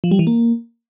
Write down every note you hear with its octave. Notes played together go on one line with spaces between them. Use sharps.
F3
G3
E3
A#3